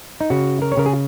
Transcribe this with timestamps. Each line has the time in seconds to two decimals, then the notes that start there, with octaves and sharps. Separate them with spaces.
0.21 D#4
0.30 C#3 F#4
0.62 A#4
0.72 C#5
0.77 C#3 A#4
0.86 G#4